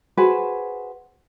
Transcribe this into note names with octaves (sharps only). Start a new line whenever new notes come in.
F#4 G#4 B4 C5